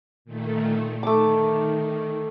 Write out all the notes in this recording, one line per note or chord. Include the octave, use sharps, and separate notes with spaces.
A#2 D#3 A3
D#3 A3 D6